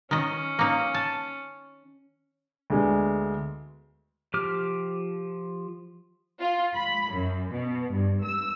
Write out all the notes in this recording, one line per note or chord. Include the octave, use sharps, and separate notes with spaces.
D#3 C#4 D#5
A#3 D#4
A5
D2 D3 G#3 B3
F3 G4 D6 F6
F4
B5
F#2
B2
G2
E6